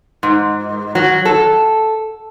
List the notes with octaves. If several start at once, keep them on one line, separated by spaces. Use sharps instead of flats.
G#2
F#3
A4